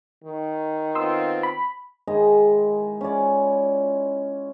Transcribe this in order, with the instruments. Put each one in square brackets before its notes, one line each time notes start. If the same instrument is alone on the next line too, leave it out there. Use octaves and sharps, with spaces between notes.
[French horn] D#3
[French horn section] B3 C4 F4 [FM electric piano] C6 D#6 E6
[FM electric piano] B5
[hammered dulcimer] D#3 G#3 E4 D#5
C#4 E4 F4 D5